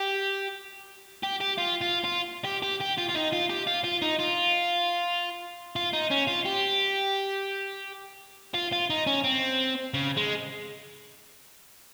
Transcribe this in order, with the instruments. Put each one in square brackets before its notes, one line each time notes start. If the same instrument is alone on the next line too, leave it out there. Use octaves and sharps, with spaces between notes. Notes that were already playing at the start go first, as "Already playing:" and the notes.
Already playing: [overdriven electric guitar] G4
G4
G4
F4
F4
F4
G4
G4
G4
F4
F4
D#4
F4
G4
F4
F4
D#4
F4
F4
D#4
C#4
F4
G4
F4
F4
D#4
C#4
C4
C#3
G#3